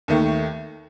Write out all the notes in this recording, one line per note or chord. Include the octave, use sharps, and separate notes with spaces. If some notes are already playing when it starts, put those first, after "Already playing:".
D#2 D#3 A3